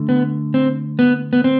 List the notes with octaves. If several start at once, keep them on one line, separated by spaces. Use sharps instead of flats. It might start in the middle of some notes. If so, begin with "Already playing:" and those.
Already playing: D3 A3
B3
C4
B3
B3
C4